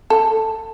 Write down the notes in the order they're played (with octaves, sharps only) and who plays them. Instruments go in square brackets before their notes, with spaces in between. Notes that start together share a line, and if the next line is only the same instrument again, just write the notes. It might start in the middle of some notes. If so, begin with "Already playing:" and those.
[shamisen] A4